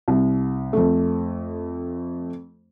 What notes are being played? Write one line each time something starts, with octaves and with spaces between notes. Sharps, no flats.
C2
F2 A3